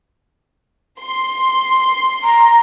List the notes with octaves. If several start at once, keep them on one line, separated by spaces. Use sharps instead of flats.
C6
A#5